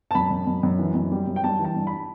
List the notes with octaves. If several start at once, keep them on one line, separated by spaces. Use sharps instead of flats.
A5
F#2 B5
F#2
F#2
F#2
E3
F#2
G3
F#2
G5
G3 A5
E3
A5
G2
B5